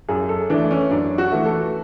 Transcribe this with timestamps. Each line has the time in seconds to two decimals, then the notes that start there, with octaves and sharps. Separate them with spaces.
0.09 F#2 G#4
0.29 A4
0.50 E3 A3 D4
0.71 C#4
0.90 F#2 D4
1.18 F#4
1.32 E3 A3
1.46 A4